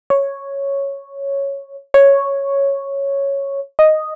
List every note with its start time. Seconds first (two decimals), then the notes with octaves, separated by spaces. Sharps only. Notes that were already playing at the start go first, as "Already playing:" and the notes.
0.10 C#5
1.94 C#5
3.79 D#5